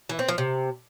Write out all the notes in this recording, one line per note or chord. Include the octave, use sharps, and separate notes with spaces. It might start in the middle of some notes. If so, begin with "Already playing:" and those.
E3
C4
F3
C3